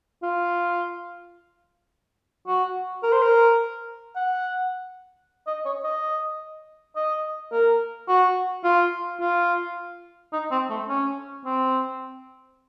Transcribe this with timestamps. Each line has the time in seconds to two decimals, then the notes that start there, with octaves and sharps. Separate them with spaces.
0.23 F4
2.47 F#4
3.03 A#4
3.13 C5
3.22 A#4
4.16 F#5
5.47 D#5
5.65 C#5
5.84 D#5
6.96 D#5
7.52 A#4
8.08 F#4
8.64 F4
9.20 F4
10.33 D#4
10.51 C4
10.70 A3
10.89 C#4
11.45 C4